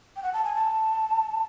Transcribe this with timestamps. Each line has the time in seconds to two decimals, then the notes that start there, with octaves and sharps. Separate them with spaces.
0.16 G5
0.23 F#5
0.33 A5
0.44 G#5
0.55 A5